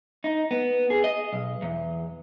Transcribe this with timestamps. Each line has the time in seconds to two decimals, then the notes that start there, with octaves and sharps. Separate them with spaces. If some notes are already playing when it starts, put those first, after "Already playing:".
0.24 D#4
0.51 B3
0.90 G#4
1.04 D#5
1.33 B1
1.62 E2